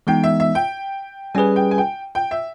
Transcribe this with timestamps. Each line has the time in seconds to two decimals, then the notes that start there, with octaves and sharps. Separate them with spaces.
0.07 E3 G#3 B3 D#4 G5
0.24 E5
0.40 E5
0.55 G5
1.35 G3 C#4 G#4 B4 G#5
1.56 G5
1.71 G#5
1.78 G5
2.15 G5
2.31 E5